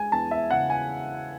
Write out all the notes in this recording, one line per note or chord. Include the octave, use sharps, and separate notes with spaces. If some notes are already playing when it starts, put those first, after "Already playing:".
Already playing: G#3 G#5
E2 A5
E5
C#3 F#5
G#5